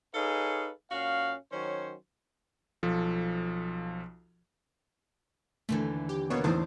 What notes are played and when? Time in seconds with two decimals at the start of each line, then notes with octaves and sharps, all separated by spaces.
0.15 D#4 G#4 A4 B4 C#5 F5
0.90 A#2 C#4 F#4 F5
1.52 D#3 F#3 C#4 C5 C#5
2.83 B1 F3 A4
5.69 D#2 D3 E3 A3
6.09 G4
6.30 B2 A#3 B3 C#5
6.44 E2 A2 D#3 C5